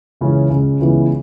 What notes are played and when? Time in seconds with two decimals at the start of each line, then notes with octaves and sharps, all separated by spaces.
0.21 C#2 C#3 E3 C#4 E4
0.50 C#2 C#3 G#3 C#4
0.80 C#2 C#3 E3 B3